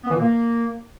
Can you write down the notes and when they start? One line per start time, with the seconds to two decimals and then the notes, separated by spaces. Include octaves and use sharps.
0.04 B3
0.09 E3
0.14 A#2
0.20 A#3